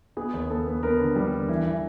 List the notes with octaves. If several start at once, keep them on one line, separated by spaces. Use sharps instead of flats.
B3 G#4
D#2
B3 A4
B3
B3 A#4
D3
G3
D3
E3
E3